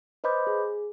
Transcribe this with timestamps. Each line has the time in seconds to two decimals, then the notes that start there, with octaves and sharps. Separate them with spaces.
0.24 B4 C5 D#5 B5 D6 G6
0.47 G#4